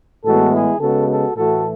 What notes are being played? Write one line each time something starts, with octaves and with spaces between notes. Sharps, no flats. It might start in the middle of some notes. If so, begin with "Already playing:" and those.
A2 E3 G#3 B3 F#4 A4
E4 G#4
C#3 G#3 B3 F#4 A4
F#4 A4
A2 E3 A3 F#4 A4